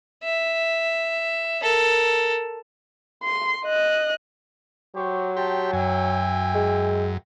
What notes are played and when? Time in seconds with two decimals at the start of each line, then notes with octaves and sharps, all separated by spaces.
0.24 E5
1.62 A4 A#4
3.24 C6
3.66 D#5 F#6
4.96 F#3 G4 C5 C#6
5.37 G4 G5 A5 C6
5.73 F#2 E5 G5 G#5
6.55 G#3